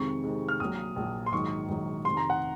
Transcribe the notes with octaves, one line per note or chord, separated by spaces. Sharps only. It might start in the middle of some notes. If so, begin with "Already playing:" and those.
Already playing: F2 C3 D#3 G#3 C#6
F2 C3 D#3 G#3
F6
A#1 A#2 F#3 D#6
A#1 A#2 F#3
C6
A#1 G#2 D#3 F#3 C#6
A#1 G#2 D#3 F#3
F1 F2 D#3 C6
A#5
F#5